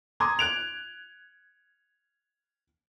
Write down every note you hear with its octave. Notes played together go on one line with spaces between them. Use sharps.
A#5 C6 D6 D#6 G#6
F#6 D7 F7